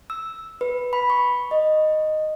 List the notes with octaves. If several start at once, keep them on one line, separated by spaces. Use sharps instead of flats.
E6
B4
B5
C#6
D#5